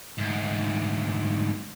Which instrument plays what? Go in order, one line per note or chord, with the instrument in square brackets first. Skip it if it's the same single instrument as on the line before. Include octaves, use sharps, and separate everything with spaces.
[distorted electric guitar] D2 G#2